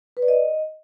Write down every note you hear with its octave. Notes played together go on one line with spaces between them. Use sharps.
B4
D5
D#5